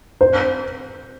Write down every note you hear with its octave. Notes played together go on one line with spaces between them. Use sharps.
C5